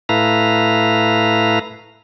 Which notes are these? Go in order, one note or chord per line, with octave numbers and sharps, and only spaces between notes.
A2 A3 E4 B4 F5 A#5